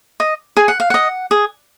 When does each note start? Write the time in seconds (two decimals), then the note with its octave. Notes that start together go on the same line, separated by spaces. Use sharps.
0.20 D#5
0.57 G#4 G#5
0.68 F#5
0.80 F5
0.90 D#5 F#5
1.31 G#4